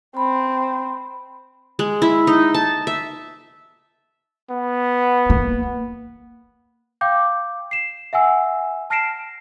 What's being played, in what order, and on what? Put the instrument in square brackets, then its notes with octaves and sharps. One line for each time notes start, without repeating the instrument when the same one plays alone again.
[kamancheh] C4 [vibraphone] B5
[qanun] G#3
E4
D#4
A5
E5
[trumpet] B3
[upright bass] A#3
[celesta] F5 G5 D6 G6
C7 E7
E5 F#5 G#5 E6
A5 F6 A#6 C7 D7 E7